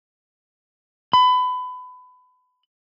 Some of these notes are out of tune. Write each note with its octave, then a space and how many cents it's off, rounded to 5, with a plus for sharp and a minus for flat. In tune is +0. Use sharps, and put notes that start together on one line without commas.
B5 +25